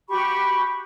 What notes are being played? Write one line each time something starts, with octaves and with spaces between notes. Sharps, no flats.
F#4 G4 B5 C#6